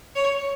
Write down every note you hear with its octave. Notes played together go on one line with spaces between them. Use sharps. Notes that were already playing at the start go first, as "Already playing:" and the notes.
C#5